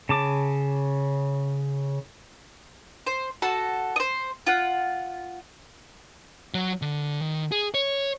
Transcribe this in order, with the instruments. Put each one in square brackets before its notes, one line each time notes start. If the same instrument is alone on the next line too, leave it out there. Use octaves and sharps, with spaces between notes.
[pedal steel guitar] C#3 A5 D6
[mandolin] C5
F#4 A4 A5
C5 D#5
F4 F#5
[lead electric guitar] F#3
D3
D#3
G#4
C#5